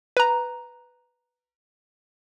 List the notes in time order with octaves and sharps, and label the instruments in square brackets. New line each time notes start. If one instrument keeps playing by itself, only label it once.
[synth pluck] B4 A#5